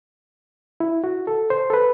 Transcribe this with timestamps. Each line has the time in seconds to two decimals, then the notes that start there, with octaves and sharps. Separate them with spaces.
0.80 E4
1.04 F#4
1.27 A4
1.50 C5
1.70 A4
1.74 B4